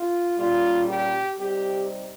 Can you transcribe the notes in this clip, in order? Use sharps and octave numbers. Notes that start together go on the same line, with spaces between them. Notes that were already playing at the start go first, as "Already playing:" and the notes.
Already playing: F4
A#2 G3 A#3 C#4 F4
G4
C3 G3 C4 D#4 G4